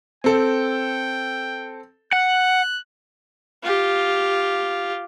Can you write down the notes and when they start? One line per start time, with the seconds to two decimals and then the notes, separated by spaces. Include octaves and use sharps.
0.24 C4 A4 G5
2.13 F#5 F#6
3.63 F4 G4